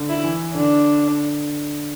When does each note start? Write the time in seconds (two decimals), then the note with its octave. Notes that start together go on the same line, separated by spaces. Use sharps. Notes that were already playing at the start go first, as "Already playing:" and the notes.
Already playing: D3
0.09 E4
0.24 E3
0.55 D3 D4